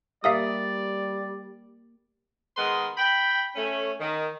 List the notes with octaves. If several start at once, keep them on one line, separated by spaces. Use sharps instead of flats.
G3 A#3 G4 A#4 D5 E5 F5 D#6
D#3 G#3 B3 A#4 B4 C6
G5 B5
A3 C#4
D#3